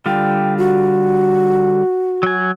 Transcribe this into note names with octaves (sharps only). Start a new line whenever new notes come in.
D3 G3 F4 G5
F#4
F#3 G#5